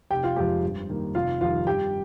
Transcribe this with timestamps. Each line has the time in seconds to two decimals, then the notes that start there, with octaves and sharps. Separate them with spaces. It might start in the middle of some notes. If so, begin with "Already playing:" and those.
0.10 F1 G4 G5
0.24 F4 F5
0.36 F2 C3 F3 G#3 G4 G5
0.62 G2
0.89 D#3 G3 A#3
1.14 F1 F4 F5
1.41 F2 D#3 G3 F4 F5
1.67 G2 G4 G5